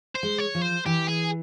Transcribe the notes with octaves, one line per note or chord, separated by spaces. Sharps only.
C5
G#3
C#5
F3
C5
E3 G4
G#4